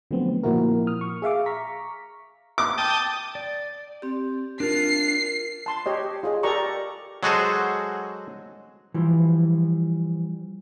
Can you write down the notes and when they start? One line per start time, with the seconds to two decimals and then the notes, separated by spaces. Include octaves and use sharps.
0.11 D3 F3 F#3 A3 B3 C4
0.43 A#2 F3 A#3 E4 F#4 A#4
0.87 D#6 F6
1.01 C#6
1.22 G#4 E5 F5 D6
1.46 A#5 C#6 B6
2.58 D6
2.78 G5 A5 D#6
3.35 D5
4.02 C4 G4
4.60 D4 F4 A#4 C7
5.66 A5 C6
5.86 G4 C#5 D#5
6.23 F4 G#4 D#5
6.43 G4 A4 A#4 D5 A#5 C#6
7.23 F#3 G#3 F#4 G#4 A4 C5
8.94 E3 F3 G3